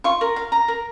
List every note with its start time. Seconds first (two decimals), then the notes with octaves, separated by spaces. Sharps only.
0.04 F4 C#6
0.21 A#4
0.36 F5
0.52 A#5
0.68 A#4